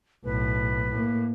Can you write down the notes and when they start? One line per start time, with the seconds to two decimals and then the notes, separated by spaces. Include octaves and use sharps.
0.25 B1 A2 B4
0.91 A2 A#3